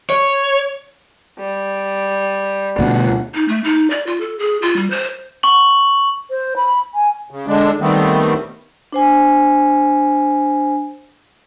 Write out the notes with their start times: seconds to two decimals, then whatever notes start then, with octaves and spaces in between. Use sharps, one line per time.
0.10 C#5
1.39 G3
2.79 D2 B2 F#5
3.35 D#4
3.48 A3
3.64 D#4
3.90 D5
4.07 F4
4.20 A4
4.39 G#4
4.62 F4
4.76 G3
4.90 C5
5.43 C#6 F#7
6.30 C5
6.56 B5
6.94 G#5
7.31 C#3
7.47 D3 G#3 D4
7.81 D#3 G3 A3 B3 C4
8.92 D4 C5 G#5